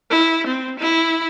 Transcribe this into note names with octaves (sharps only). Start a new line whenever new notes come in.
E4
C4
E4